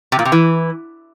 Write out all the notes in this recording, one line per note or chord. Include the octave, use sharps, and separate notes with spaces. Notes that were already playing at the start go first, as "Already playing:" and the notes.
C3
A#2
C3
E3